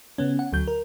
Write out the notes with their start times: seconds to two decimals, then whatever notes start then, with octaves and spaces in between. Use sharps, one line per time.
0.18 C#3 B3 C#4
0.39 F#5
0.52 D2 F#3 G6
0.67 A#4